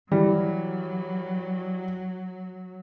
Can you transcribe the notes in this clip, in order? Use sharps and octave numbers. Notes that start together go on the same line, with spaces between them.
E3 F#3 G3